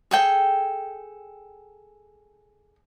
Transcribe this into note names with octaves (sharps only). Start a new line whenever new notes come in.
G#4 A4 G5